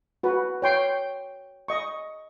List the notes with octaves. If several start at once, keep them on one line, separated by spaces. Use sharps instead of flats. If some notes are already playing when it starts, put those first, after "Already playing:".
F#4 B4
C#5 G5 C6
D#5 C#6